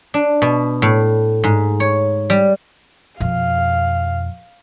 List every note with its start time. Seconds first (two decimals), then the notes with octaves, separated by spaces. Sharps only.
0.14 D4
0.42 B2
0.82 A2
1.44 G#2
1.80 C#5
2.30 G3
3.20 F2 B2 F5